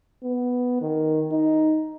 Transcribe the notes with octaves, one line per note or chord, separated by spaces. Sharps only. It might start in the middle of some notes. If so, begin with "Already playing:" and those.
B3
D#3
D#4